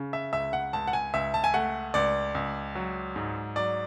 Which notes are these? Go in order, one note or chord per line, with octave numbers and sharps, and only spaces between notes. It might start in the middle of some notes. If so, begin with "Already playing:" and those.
Already playing: C#3
E5
C#2 E5
F#5
C#2 A5
F#5
G#5
C#2 E5
A5
G#5
A3 F#5
C#2 D5
C#2
F#3
G#2
F#3 D5